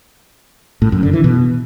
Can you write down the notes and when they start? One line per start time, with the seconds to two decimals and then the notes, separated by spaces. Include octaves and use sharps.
0.82 A2
0.92 F#2
1.03 D3
1.13 E3
1.24 B2